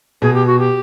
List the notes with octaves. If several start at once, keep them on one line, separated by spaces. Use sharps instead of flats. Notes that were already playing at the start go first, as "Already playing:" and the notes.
B2 G#4
G4
F#4
G4